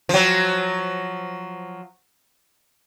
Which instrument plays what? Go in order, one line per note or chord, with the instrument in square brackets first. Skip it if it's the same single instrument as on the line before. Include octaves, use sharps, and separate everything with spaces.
[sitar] F3 F#3